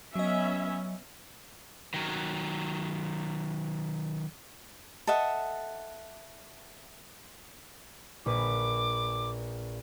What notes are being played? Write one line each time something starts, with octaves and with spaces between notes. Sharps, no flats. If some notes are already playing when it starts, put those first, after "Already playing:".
F#3 B3 C#4 D#5 E5
D#3 F#3
A4 D#5 E5 F#5
A#1 B4 D6